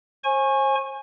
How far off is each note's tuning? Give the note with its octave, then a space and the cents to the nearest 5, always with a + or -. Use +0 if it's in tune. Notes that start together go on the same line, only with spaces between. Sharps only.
C5 +40 G#5 +0 C#6 -20